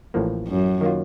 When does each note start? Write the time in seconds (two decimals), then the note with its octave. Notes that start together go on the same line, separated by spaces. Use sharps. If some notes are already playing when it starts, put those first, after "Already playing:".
0.14 A1 A2 F3 A#3
0.47 F#2
0.81 D#3 A#3 F4